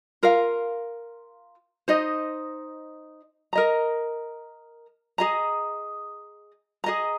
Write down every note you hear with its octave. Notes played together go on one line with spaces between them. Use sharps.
F4 A#4 F5
D#4 C5 D#5
A#4 D#5 A#5
G#4 D#5 A#5
G#4 D#5 A#5